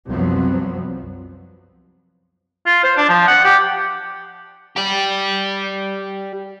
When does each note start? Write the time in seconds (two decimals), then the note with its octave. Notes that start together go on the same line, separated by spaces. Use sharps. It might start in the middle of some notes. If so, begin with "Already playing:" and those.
0.10 C2 F#2 F3 F#3 B3 C4
2.66 F4
2.84 C5
2.97 D4
3.09 F3
3.27 F#5
3.44 G4
4.76 G4 D5